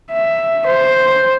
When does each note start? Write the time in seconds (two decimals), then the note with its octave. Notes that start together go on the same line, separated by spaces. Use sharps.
0.12 E5
0.66 C5